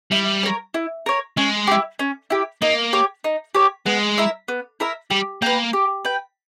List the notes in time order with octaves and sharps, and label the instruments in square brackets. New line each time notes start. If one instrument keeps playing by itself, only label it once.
[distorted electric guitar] G3 [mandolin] E4
[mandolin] A#4 C#5
E4
A#4 C#5
[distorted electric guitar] G#3 [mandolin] C#4
[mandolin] E4 G4
C#4
E4 G4
[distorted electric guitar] A#3 [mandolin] D#4
[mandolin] G4 C#5
D#4
G4 C#5
[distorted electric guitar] G#3 [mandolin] B3
[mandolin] E4 A#4 E5
B3
E4 A#4 E5
[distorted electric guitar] G3 [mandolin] G4
[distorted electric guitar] A#3 [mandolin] B4 G5
[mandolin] G4
B4 G5